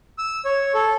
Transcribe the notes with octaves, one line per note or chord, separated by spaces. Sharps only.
E6
C#5
A4